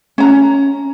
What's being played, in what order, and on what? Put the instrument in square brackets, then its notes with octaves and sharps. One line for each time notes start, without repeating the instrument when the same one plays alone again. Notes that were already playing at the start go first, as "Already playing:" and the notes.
[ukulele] C#4 A#5